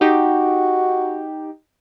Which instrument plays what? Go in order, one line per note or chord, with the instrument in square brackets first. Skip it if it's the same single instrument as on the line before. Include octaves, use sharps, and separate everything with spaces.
[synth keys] D#4 G4 [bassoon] F#4